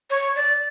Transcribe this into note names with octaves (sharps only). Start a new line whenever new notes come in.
C#5
D5